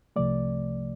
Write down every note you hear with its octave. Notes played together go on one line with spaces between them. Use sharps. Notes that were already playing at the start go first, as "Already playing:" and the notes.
C2 C3 F3 A3 D5